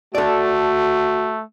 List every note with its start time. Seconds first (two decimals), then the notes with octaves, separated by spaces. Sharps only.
0.15 A3 F#4 A4 D5